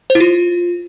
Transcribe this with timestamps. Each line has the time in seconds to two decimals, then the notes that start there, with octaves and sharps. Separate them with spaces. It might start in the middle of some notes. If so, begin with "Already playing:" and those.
0.10 C5
0.15 E4
0.20 F4